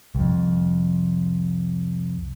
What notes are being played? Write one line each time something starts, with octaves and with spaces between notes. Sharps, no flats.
C2 F2